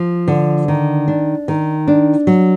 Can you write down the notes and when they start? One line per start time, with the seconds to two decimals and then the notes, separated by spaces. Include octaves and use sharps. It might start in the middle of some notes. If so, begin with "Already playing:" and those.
Already playing: F3
0.28 D3
0.68 D#3
1.08 D4
1.48 D#3
1.88 D4
2.27 F#3